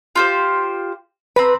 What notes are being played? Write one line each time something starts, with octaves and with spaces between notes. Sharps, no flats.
F4 G4 C5
C4 B4 A#5 B5